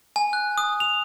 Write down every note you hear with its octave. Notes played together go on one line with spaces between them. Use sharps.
G#5
F#6
D#6
F7